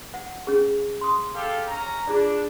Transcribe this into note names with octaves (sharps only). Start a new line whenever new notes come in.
F#5
C#4 G#4
C6 D#6
G4 A4 F5
C#4 A#5
D4 F4 G#4 D5